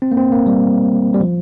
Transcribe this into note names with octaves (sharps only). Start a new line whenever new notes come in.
C4
A#3
C4
A#3
G3
G3
F3